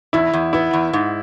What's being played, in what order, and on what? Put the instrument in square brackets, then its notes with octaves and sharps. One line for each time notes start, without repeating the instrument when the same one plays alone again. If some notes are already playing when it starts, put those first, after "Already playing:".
[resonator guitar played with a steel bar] E2 [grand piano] E4
[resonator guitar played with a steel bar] E2
[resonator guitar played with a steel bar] B3 [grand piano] E4
[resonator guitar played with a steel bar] E2
G#2